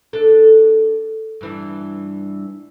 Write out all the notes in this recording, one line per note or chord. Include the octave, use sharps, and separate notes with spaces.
D4 A4
G2 E3 D4